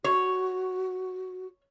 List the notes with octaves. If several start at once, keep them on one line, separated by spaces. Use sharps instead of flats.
F#4 C#5